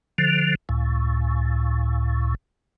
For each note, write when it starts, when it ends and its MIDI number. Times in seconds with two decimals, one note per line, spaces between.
0.18 0.55 50
0.18 0.55 53
0.69 2.35 37
0.69 2.35 45